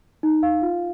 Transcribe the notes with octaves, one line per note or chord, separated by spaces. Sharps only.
D#4
F5
F4